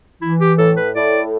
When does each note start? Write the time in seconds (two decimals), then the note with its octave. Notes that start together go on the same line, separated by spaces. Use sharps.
0.21 E3 E4
0.40 G4
0.58 A2 A4
0.77 B4
0.95 A2 D5